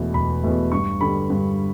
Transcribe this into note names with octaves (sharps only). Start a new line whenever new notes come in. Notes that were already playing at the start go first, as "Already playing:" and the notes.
Already playing: E1 E2 B2 A3
E1 B5
E2 B2 A3
G2 C#6
D3 G3 B5
G2